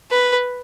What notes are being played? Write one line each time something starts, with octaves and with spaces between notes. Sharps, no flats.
B4